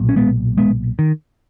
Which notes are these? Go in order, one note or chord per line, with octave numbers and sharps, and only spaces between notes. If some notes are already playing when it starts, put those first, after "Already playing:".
Already playing: B1 A#2
C#4
G#3 B3
G#3 B3
D#3